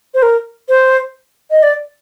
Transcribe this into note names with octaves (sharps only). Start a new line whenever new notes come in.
C5
A#4
C5
D#5
D5